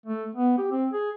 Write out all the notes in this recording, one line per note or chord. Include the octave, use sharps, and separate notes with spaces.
A3
B3
G4
C4
G#4